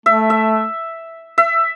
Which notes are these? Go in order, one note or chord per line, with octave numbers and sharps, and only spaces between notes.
A3 E5
E5
E5